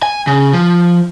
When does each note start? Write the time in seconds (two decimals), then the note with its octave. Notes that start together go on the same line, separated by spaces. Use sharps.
0.03 G#5
0.27 C#3
0.53 F3